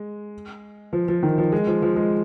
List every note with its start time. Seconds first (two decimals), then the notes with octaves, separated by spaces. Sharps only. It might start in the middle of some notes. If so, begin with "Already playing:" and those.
Already playing: G#3
0.93 F3
1.08 F3
1.23 D#3
1.38 F3
1.52 G#3
1.67 F3
1.82 F3
1.96 G#3